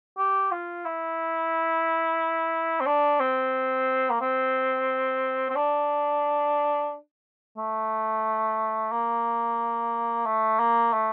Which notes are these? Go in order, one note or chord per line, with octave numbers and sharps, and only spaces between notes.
G4
F4
E4
C4
D4
C4
A#3
C4
C4
D4
A3
A#3
A3
A#3
A3